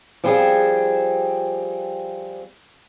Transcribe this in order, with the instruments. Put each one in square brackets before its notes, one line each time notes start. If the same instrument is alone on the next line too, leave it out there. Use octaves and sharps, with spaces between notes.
[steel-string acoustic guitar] F3 G3 C4 G#4